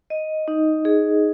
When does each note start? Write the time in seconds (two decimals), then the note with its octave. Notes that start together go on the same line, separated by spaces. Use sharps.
0.10 D#5
0.48 D#4
0.85 G#4